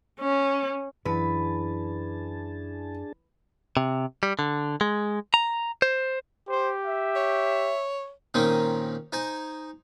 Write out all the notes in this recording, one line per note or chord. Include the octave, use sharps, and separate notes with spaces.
C#4
F#2 E3 D4 G#4 B4 A5
C3
G3
D3
G#3
A#5
C5
G4 C5
E5
C#5
A#2 D#3 C4 C#4 D#4
D#4 C5 G#5